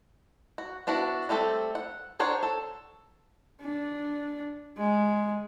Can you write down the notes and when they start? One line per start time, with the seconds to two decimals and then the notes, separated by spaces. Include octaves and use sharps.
0.58 F#4
0.87 B3 D4 E4 F#4
1.29 G3 A3 C4 A4
1.75 F#5
2.19 D4 A#4 C5 C#5 F#5
2.43 A4
3.61 D4
4.78 G#3